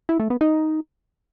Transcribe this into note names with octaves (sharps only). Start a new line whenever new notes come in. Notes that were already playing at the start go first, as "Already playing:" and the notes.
E4
A3
B3
D#4